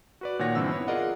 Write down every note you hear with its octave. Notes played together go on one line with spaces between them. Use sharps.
F#4 B4 D5
A#2 D#3 C#5 F#5 A#6
G2 D3 E3 C4 E6
B3 E4 C#5
F4 G#4 A#4 D5 D#5 F#5